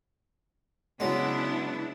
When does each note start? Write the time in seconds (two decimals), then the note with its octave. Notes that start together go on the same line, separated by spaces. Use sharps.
1.00 C#3 F#3 G#3 B3 D4 E4